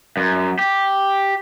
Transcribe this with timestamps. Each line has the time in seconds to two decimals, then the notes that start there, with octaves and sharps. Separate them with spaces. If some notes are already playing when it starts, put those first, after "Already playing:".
0.17 F#2
0.59 G4